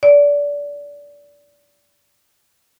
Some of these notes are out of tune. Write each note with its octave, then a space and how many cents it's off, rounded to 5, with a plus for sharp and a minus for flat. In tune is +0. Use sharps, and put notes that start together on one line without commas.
D5 -25